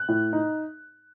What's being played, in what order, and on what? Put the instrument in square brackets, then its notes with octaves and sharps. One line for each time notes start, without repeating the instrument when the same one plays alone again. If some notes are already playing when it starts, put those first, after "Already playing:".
Already playing: [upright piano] F#6
A2
D#4